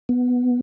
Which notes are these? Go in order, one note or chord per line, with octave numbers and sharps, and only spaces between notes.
B3